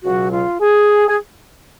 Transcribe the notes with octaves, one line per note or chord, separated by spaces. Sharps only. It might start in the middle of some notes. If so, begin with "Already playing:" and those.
C#2 B2 F#3 F#4
F4
G#4
G#4